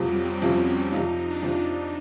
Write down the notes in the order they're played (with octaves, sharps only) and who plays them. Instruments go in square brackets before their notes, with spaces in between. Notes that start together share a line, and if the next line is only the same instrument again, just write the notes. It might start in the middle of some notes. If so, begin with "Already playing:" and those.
Already playing: [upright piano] F2 C3 F3 [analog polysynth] F#3
[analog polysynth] G3
C4
[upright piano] F2 C3 F3 [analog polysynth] C#4
[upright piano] F2 C3 F3 [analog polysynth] D#4
[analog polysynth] D#4
D4
[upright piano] F2 C3 F3 [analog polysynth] D#4